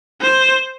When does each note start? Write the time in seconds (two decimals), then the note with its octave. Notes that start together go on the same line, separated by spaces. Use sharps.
0.22 C5